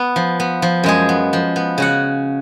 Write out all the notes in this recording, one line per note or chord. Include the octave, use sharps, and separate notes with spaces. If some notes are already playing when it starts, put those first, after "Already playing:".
Already playing: B3
F3
B3
F3
F#2 G#3 G#4
B3
F3
B3
C#3 F#4 F#5